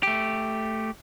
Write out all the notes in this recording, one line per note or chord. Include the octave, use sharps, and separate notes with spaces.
A3 G4